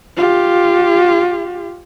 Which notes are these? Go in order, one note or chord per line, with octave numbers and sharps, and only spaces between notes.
F4 G4